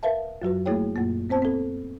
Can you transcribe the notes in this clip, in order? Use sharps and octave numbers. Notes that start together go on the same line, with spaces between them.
A#4 B4 E5 F5 A5
F#2 F#3 F#4 B4
A3 A#3 E4 G#4 C#5 G5
F#2 A#2 A#3
B3 C4 C5 A5
C4 A4